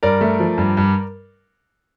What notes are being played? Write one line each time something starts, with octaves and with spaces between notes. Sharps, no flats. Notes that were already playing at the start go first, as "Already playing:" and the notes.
G2 A#4 D5
A3
F3
G2
G2